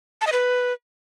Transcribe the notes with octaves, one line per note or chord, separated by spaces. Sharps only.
A5
D#5
B4